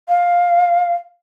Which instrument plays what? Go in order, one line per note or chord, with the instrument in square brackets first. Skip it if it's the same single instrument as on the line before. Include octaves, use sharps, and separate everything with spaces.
[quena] F5